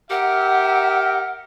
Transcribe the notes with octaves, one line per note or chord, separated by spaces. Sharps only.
G4 A#4 E5 F#5